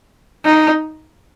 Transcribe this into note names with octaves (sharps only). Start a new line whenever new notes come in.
D#4